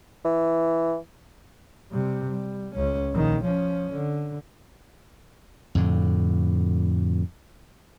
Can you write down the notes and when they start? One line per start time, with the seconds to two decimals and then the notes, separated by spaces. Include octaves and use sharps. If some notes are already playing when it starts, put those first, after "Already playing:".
0.25 E3
1.91 C3 G3
2.30 G3
2.75 C#2 C#4
3.13 A#1 D#3
3.44 F3 C#4
3.92 D3
5.75 F2 A2 D3